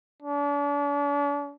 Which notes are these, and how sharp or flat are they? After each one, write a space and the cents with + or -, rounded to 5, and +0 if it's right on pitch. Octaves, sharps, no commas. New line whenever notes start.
D4 -40